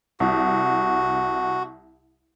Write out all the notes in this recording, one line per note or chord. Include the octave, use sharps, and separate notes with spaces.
C2 F#4